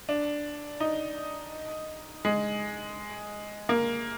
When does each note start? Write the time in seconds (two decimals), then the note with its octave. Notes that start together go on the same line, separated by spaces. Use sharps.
0.09 D4
0.80 D#4
2.25 G#3
3.69 A#3